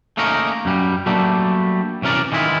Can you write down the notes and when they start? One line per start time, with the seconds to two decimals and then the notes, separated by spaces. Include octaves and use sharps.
0.17 A3 A#3 C#4 D#4 A#4
0.65 F#2 G3
1.06 F#3 G3 A3 A#3 D4
2.02 C2 E3 C#4 A#4 D5
2.32 D#3 E3 G#3 E4 F4